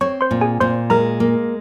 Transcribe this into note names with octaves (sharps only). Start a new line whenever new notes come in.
C4 C#5 C#6
C5 C6
A#2
G#4 G#5
A#2 C5 C6
G#3 A#4 A#5
A#3